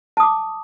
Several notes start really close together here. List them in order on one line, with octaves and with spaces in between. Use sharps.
A5 D#6 D6